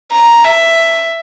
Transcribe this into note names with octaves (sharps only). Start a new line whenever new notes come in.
A#5
E5